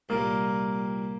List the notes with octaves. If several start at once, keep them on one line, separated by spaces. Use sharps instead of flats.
C2 A#2 G3 A#3